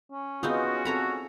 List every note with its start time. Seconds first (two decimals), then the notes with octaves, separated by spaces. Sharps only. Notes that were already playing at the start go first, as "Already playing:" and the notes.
0.12 C#4
0.43 B3 C4 D#4 F4 F#4 G#4
0.85 C4 A4 C#5 A#5 B5